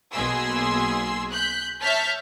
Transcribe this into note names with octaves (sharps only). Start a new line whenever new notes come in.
B1 B2 A#3 G#4 C6 E6
F#6 G6 B6
C#5 E5 A5 F6 G6 B6